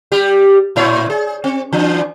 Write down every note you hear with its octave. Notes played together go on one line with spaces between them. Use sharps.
G3 G4
A2 E4 C#5
G#4
C4
E3 D4